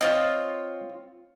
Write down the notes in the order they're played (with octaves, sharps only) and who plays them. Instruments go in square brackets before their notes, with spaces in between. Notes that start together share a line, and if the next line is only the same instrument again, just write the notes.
[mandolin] C4 F4 C#5 [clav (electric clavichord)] D#5